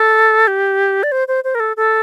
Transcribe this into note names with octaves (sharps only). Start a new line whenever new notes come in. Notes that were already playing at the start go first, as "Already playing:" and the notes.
Already playing: A4
G4
D5
C5
C5
C5
A#4
A4
A4